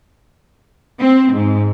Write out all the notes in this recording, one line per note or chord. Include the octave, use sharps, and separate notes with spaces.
C4
G#2